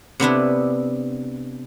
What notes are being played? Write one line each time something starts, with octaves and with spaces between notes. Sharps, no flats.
C3 B3 D4 E4